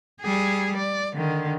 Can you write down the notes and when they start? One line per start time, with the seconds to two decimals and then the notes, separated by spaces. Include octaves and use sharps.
0.22 G3 G#4
0.77 D5
1.16 D3 D#3